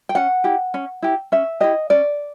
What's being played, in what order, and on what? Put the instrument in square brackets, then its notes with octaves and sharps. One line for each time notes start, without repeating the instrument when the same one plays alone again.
[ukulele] G5
C#4 F#5
E4 G4
C#4
E4 G4
C#4 E5
E4 G4 D#5
C#4 D5